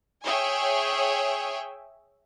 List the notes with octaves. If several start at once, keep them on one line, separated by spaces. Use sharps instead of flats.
G#4 C#5 E5 G5 G#5